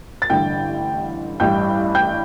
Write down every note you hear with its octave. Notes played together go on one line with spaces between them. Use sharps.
A6
A1 G2 D3 G5 G6
A1 G2 G3 G5 G6
G5 G6